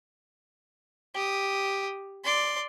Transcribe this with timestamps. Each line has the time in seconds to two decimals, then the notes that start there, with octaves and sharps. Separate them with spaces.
1.15 G4 D#6
2.24 D5 C6